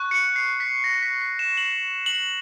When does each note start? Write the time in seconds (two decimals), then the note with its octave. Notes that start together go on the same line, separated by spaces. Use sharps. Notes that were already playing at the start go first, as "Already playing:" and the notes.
Already playing: C#6 F#6
0.11 C#7
0.36 C7
0.60 B6
0.84 A#6
1.02 B6
1.21 B6
1.39 E7
1.57 F#7
2.06 F#7